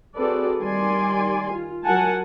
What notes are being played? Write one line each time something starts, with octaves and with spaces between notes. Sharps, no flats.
C4 F#4 G#4 A4 B4 D5
D#3 G3 D5 G#5 C6
F4
F#3 A#4 F#5 G#5 A5